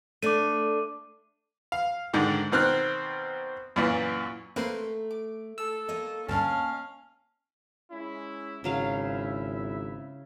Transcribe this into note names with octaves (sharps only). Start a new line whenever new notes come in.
A3 D4 D6 D#7
F5
G#2 D3 D#3
B2 D#3 C4 F6 F#6
F#2 A#2 E3
A3 A#3 C4 A#4 B4 C6
D6
A4 E6
A#3 C#5 D#5
D2 G2 C#4 F5 A5
G#3 C#4 E4
G#1 C#3 F#3 E4 E5 F5